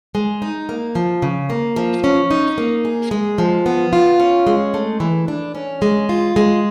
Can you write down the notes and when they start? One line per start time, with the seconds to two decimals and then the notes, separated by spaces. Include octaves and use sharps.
0.15 G#3
0.42 D#4
0.69 A#3
0.95 F3
1.22 C#3
1.50 A#3
1.76 F3
2.04 C#4
2.31 D#4
2.58 A#3
2.85 G#4
3.11 G#3
3.38 F3
3.66 B3
3.93 F4
4.20 C#4
4.47 G#3
4.74 A3
5.00 E3
5.28 D4
5.55 C#4
5.82 G#3
6.09 F4
6.36 G#3